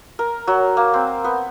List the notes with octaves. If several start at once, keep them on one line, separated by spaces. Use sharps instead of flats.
A#4
F#3
A#3
C4
B3